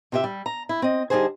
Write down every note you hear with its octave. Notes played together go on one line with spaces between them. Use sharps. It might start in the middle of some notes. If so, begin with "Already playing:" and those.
C3 F4 G4 D5 E5
G3
A#5
E4
C4 D#5
D3 G3 D#4 F#4 G#4 C5